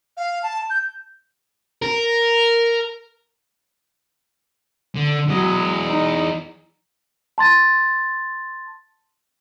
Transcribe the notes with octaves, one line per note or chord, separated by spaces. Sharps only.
F5
A5
G6
A#4
D3
E2 F#3 D#5
D#4
A5 C6 A6